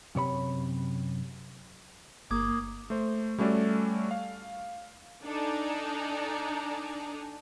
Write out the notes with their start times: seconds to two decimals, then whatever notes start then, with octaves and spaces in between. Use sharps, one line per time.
0.15 F#2 C3 C#5 B5
2.31 G1 A#3 D6 D#6 G#6
2.90 A3 C5
3.38 G3 A3 C#4 F#4 A4 D5
4.11 F5
5.23 D4 D#4 A4 D5 G#5 A#5